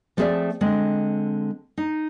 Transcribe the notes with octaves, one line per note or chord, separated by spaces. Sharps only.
F3 A3 C4 G#4 D5 E5
D3 G#3 C4
D#4